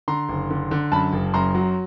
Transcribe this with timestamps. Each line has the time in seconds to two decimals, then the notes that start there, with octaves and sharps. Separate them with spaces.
0.08 D3 A#5 C6
0.29 F#1
0.50 D3
0.71 D3
0.92 F#2 A5 B5
1.13 F#1
1.34 F#2 A#5 C6
1.55 F#3